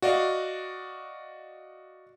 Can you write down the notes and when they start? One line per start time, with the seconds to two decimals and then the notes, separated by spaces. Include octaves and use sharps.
0.02 F#4 D5 D#5 F5